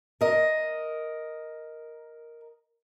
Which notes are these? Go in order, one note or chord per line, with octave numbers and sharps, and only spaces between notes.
A#4 D#5